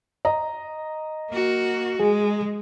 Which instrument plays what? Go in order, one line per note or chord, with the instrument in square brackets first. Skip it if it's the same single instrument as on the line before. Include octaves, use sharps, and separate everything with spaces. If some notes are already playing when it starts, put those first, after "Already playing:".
[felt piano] D#5 A#5
[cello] A#3 F#4
[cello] G#3 [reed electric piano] G#4